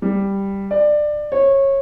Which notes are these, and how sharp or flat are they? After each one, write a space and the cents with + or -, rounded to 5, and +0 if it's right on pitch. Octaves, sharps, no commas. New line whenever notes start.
G3 +5
D5 +20
C#5 -20